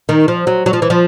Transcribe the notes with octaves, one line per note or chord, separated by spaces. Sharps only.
D#3
F3
F#3
F#3
F3
E3
F3